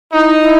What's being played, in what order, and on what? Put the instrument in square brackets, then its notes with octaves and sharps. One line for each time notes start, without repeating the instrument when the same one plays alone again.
[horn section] D#4 [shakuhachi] E4
[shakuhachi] E4